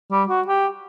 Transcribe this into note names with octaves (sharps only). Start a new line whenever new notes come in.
G3
F#4
G4